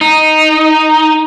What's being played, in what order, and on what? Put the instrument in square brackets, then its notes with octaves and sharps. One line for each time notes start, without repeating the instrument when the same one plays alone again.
[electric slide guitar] D#4